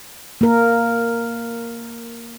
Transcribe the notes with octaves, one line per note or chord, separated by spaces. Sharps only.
A#3 A#4